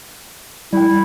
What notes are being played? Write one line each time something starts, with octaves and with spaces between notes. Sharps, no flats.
G3 E4 G5